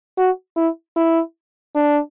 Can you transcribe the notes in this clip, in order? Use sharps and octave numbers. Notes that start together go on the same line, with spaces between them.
F#4
E4
E4
D4